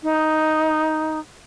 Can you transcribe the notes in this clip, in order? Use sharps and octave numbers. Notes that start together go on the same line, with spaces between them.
D#4